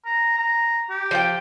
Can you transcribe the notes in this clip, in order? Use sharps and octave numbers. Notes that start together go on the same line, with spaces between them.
A#5
A#5
G4
F3 D5 G5